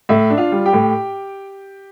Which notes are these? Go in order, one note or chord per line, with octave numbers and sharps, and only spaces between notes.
A2 E5
D4
F4 F5
G3
G4 G5
A2